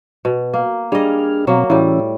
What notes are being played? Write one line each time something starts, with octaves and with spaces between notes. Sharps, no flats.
B2
A#3
G3 D4 G#4 D#5 F5
B2 F#3 A#3 C4
A2 E3 G3 C#4 E4